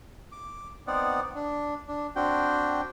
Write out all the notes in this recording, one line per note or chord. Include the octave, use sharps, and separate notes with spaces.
D6
B3 C4 D#4 D5 F#5
D4
D4
C4 D4 F#4 G5